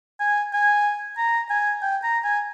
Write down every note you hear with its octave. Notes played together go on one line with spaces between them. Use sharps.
G#5
G#5
A#5
G#5
G5
A#5
G#5